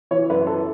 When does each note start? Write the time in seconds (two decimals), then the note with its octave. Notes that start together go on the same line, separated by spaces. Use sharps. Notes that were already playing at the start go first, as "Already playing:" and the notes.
0.11 E3 C#5
0.30 F#2 B4
0.47 E3 A4